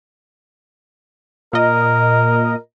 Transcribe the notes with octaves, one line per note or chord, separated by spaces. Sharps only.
A#2 A#4 D#5